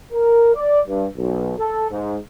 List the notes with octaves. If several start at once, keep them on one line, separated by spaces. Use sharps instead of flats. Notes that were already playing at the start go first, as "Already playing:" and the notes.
A#4
D5
G2
B1
A4
G#2